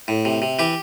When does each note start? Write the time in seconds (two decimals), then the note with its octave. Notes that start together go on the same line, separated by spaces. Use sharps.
0.08 A2
0.25 C3
0.42 C3
0.59 E3 G4